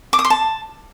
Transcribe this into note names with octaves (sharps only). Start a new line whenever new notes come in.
D6
D#6
C6
A5